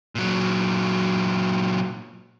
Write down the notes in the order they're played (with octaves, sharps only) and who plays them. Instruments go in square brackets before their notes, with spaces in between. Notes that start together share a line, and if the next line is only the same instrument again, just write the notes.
[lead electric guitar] A#2 F#3